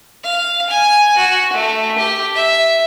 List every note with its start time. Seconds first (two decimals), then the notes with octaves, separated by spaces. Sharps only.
0.24 F5
0.69 G#5
1.17 F#4
1.53 A3
1.98 G4
2.35 E5